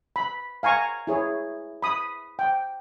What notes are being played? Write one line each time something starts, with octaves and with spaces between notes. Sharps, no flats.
B5
F5 G#5 A#5 C#6
E4 G#4 C#5
B5 D#6
G5